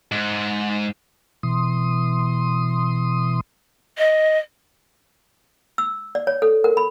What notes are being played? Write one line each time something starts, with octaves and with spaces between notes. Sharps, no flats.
G#2
B2 E3 C6 D#6
D#5
E6
D5
C#5
A4
A#4
B5